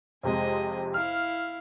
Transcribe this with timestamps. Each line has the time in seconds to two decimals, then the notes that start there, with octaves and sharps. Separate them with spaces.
0.23 F2 C3 G#3 G#4 D#5
0.94 E4 F5 F6